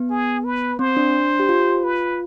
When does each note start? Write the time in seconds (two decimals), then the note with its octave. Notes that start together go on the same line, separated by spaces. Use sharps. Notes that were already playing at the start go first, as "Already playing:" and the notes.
Already playing: B3
0.10 G#4
0.44 B4
0.79 C4 C5
0.97 D4
1.39 G4
1.49 F4
1.84 B4